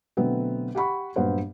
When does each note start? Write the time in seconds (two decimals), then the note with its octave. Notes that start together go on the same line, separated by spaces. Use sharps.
0.17 B2 D3 F#3 A3 B3 C4
0.75 G4 F#5 B5 C#6
1.16 A#1 G2 F#3 B3 C5 F#5